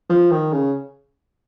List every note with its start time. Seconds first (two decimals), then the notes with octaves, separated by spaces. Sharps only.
0.10 F3
0.31 D#3
0.52 C#3